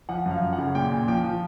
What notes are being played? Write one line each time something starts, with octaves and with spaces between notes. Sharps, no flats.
F3 F#5
F#2
F5
F#2
F#5
C#3
A#2 G5
A#2
F3 G5
F3